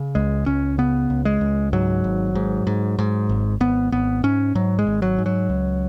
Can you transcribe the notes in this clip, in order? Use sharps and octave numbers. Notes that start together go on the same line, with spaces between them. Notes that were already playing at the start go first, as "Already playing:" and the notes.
Already playing: C#3
C#2 G#3
C#2 C#4
C#3 B3
C#2
G#3
C#2
G#2 F#3
G#1
G#2
G#2
G#2
G#1
G#1 B3
G#1 B3
G#2 C#4
G#2 F#3
G#3
G#1
F#3
G#2
F#3
C#2